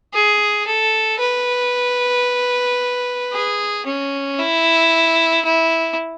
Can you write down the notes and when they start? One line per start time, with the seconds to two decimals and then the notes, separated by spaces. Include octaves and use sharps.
0.14 G#4
0.67 A4
1.19 B4
3.33 G#4
3.86 C#4
4.39 E4
5.45 E4